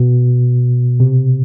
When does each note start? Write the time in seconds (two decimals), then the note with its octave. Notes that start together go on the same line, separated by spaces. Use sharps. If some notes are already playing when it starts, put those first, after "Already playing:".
Already playing: B2
1.00 C3